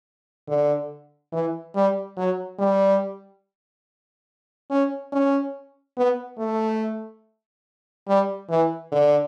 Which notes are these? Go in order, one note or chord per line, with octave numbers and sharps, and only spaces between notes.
D3
E3
G3
F#3
G3
C#4
C#4
B3
A3
G3
E3
D3